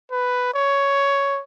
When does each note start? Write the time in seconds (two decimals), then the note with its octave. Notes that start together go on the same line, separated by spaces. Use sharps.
0.11 B4
0.54 C#5